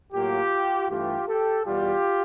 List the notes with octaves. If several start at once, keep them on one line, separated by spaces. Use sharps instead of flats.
A2 F#3 A#3 F4 G4
G2 E3 A3 F4 G4
G4 A4
E2 B2 G3 F4 G4